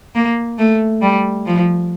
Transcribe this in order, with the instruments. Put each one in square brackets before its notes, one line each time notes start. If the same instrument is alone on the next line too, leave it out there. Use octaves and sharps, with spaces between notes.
[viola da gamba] A#3
A3
G3
F3